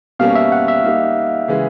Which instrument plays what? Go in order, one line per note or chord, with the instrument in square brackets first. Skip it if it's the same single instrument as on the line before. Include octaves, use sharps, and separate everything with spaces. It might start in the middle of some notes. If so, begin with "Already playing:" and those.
[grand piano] B2 G3 A#3 C#4 [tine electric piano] F5
[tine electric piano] E5
F#5
E5
[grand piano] G3 A#3 D#4 G4 [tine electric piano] F5
[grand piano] C#3 E3 G#3